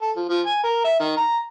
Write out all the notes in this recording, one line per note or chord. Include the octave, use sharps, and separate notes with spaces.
A4
F3
F3
G#5
A#4
E5
D#3
A#5